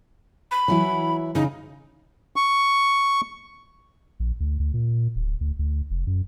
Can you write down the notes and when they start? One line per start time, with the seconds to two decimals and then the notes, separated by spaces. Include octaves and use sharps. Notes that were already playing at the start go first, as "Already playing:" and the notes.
0.51 B5
0.68 E3 F#3 E4
1.35 C#3 D#4
2.36 C#6
4.20 A#1
4.40 D2
4.60 D2
4.74 A#2
5.16 D1
5.41 D2
5.59 D2
5.91 F1
6.07 F#2